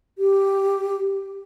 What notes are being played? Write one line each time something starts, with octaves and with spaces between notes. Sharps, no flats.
G4